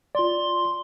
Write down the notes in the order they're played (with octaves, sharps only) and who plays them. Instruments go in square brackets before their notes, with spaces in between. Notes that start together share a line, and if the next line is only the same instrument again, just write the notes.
[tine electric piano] F4 D5 [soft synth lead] C6